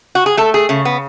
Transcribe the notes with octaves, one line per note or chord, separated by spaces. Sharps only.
F#4
G#4
A3 A4
G#4
C#3 A3
B3